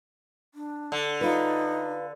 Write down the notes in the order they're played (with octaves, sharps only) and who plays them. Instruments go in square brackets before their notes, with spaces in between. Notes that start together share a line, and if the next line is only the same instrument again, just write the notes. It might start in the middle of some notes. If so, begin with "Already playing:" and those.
[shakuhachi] D4
[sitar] D3
[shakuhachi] D#4 [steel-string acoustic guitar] F4 B4